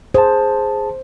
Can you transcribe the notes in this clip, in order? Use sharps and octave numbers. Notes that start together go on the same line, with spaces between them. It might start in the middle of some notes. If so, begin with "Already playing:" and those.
G#4 C5 A5